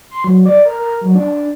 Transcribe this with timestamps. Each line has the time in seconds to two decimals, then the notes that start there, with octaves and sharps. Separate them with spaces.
0.11 C6
0.24 F#3
0.46 D5
0.65 A#4
0.79 A#4
1.01 F#3
1.15 D4